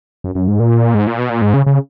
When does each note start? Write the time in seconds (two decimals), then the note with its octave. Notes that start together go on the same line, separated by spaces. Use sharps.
0.24 F#2
0.35 F#2
0.48 G#2
0.60 A#2
0.94 G#2
1.07 A#2
1.19 B2
1.30 A#2
1.42 G#2
1.54 C#3
1.66 C#3